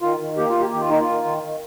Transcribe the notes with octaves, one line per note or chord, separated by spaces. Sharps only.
D#3 F4
D#3
A#3 G4
F4
A#3
G4
D#3 G4
F4
A#3 D#4
F4
A#3
D#3
D#3